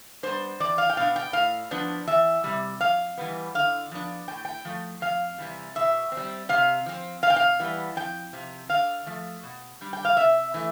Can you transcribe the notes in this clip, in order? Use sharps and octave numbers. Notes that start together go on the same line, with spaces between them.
G3 B3 D4 C5
E2 D5
F5
G5
B2 B3 D4 F5
G5
A2 F5
F3 B3 D4
E2 E5
C3 G3
F2 F5
E3 G3 B3
D3 F5
F3 B3 D4
A2 G5
G5
F3 A3
F2 F5
C3 E3 G3
B2 E5
C4
G3
C3 F5
F3 C4
C3 F5
G5
F5
E3 G3 B3
F2 G5
C3 F3
D3 F5
F3 A3
B2
G3 D4
G5
F5
C3 E5
E3 A3